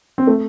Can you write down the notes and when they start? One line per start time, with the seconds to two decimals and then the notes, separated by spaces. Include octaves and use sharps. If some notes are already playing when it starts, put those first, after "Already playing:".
0.18 C4
0.27 A3